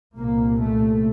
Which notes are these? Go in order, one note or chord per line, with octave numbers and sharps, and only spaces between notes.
C2 A#2 A#3
A3